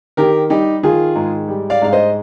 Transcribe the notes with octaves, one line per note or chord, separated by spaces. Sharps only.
D#3 G4 A#4
G3 D#4 G4
D#3 F4 G#4
G#2
G3
D5 F5
G#2 F5
C5 D#5